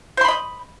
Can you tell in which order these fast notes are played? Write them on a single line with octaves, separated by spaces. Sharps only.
C5 C6 B5 D#5